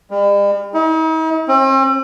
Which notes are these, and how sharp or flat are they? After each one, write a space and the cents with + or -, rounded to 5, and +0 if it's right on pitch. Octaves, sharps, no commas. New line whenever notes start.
G3 +45
D#4 +45
C4 +45